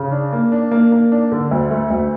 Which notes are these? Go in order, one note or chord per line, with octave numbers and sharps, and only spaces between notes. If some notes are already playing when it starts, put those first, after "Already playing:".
Already playing: C#3
D4
A#3
D4
A#3
A#3
D4
D3
D2
A3
D2